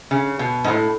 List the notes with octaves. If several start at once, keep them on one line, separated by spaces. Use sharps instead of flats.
C#3
B2
G#2
A2